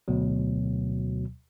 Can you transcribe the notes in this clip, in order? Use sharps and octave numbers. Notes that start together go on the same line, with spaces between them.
D2 B2 F#3